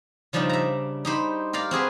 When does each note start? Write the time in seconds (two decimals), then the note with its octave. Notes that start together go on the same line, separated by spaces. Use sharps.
0.33 C#3 F3 G3 D4 D#4
0.49 E5 A#5
1.05 D#4 G4 C5 B5
1.53 G4 A#4 D5 F5
1.71 C4 F#4 G#4 B4